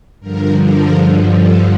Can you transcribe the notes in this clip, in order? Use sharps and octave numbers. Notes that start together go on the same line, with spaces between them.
G2 D3 F3 A#4
A#4
A4